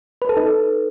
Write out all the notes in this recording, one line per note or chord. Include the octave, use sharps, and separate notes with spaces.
B4
A4
D#4